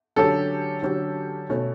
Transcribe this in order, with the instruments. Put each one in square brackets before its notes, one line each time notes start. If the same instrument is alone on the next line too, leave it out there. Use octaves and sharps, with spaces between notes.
[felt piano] D3 F#3 C#4 G4 [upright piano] A4
[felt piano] D3 F#3 C#4 G4
B2 A3 C#4